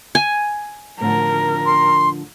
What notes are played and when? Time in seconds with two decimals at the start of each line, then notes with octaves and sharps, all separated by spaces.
0.15 G#5
1.01 A2 D3 F3 A#4
1.66 C6